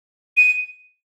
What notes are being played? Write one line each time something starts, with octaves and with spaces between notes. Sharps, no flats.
D#7